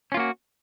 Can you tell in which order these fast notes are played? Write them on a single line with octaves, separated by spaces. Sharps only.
C#4 F4 A#3 F#4